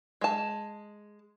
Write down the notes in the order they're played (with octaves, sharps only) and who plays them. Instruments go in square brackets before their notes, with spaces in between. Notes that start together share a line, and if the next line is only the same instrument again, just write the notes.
[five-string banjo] G#3 A5